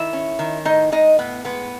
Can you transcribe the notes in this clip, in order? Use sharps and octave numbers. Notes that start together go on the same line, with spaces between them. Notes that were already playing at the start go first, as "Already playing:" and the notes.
Already playing: D#3 E4 E5
C#4
D#3
A2 D#4 D#5
G#3 D#4 D#5
A2 B3 B4
G#3 B3 B4